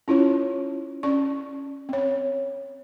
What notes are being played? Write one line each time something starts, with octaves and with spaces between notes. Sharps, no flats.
C#4 E4 F4 C#5
C#4 D5 C#6
C4 C#5